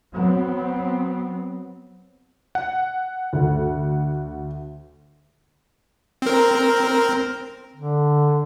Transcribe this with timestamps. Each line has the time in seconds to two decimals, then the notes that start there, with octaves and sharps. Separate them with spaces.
0.14 F#3 B3 C4
2.55 F#5
3.33 D2
6.22 C4 A#4
7.76 D3